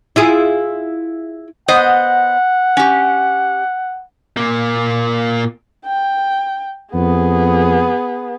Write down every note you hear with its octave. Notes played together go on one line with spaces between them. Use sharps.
E4 F4 G#4
B3 C5 D#5 F#5
C#4 G4
A#2 A#3
G5
F2 B3 G#4